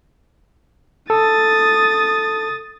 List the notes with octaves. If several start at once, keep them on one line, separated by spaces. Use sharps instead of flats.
A4 D#6 A6